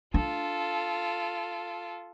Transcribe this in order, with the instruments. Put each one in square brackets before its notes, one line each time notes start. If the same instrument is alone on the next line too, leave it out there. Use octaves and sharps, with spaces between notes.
[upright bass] D4 [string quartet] F4 A4